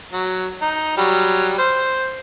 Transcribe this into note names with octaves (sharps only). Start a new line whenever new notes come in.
F#3
D#4
F#3 G3
C5